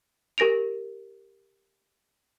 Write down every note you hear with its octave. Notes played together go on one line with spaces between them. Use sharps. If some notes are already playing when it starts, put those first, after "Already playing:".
G4 A#4 A#6 D7 F7